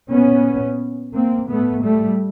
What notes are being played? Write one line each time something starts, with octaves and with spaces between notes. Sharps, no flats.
A#2 B3 C#4
A#3 C4
A2 A3 B3
G3 A3